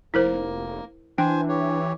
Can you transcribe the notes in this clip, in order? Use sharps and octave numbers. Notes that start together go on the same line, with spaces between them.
F1 A#3 E4 A#4 C5
E3 D4 C5 G5 G#5
G4 C#5